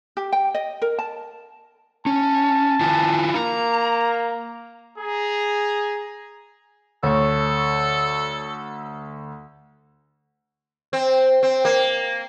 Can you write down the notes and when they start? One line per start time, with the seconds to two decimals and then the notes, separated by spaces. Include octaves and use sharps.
0.17 G4
0.33 G5
0.55 D#5
0.82 A#4
0.99 A5
2.06 C#4 A5
2.81 E4 F4 G#5
3.35 A#3 A#5
4.99 G#4 A#5
7.03 D2 A4 C#5 C#6
10.93 C4
11.43 C4
11.65 A#3